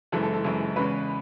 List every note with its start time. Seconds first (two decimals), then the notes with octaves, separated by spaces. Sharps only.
0.12 F#1 F#2 E3 G#3 A4
0.23 A4
0.34 A4
0.44 F#1 F#2 E3 G#3
0.76 E2 C#3 G#3 B4